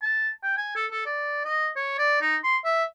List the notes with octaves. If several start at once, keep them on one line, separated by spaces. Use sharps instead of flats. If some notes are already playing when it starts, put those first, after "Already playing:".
A5
G5
G#5
A4
A4
D5
D#5
C#5
D5
D#4
C6
E5